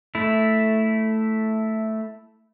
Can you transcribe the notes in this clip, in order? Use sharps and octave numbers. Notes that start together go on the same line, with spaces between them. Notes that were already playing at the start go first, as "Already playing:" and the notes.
A3 E4